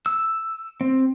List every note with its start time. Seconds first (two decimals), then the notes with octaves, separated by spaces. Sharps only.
0.06 E6
0.81 C4